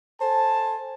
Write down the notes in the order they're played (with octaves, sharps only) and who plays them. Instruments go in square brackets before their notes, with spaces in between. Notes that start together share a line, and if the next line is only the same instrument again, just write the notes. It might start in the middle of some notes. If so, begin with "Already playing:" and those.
[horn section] A4 C5 G#5 A5